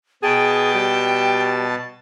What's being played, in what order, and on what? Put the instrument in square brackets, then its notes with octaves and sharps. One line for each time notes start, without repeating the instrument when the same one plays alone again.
[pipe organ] B2 A5 [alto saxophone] G#4 [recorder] G5
[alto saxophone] G3